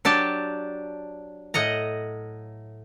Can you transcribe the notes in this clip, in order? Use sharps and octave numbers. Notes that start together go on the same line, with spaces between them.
F#3 D4 G4 A5
A2 D#5 F#5 A#5